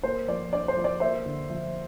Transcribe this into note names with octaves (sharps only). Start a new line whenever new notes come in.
A#3 C5
F3 D5
D4 D5
C5
F3
D5
A#3 C5 E5
D3
F3